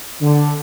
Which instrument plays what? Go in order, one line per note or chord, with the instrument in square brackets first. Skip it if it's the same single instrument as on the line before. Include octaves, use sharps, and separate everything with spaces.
[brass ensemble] D3